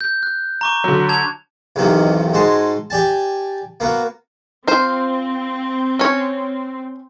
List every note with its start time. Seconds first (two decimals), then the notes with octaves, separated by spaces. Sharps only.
0.01 G6
0.23 F#6
0.61 A#5 C#6 D6
0.84 D3 F#3
1.09 A5 G#6 F7
1.76 B1 E2 C3 D#3 A#3
2.33 G#2 G#3 F#4 A5 C6
2.90 G4 D5 G#5 A5
3.80 A#3 B3 F#4
4.67 C4 F4 C5
5.99 C#4 C#5